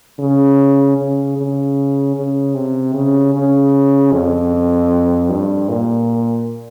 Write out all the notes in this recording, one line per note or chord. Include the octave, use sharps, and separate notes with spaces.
C#3
C#3
C#3
C#3
C3
C#3
C#3
F2
G2
A#2